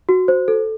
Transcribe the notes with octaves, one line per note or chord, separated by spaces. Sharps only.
F#4
C5
A4